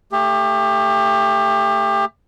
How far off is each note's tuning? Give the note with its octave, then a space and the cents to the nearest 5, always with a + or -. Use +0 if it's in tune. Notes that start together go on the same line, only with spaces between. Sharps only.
A3 +20 G4 +30